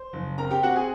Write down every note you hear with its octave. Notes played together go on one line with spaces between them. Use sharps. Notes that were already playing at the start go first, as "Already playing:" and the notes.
Already playing: C5
F#1
C4 A#4 A#5
G4 G5
C4 F#4 F#5
G#4 G#5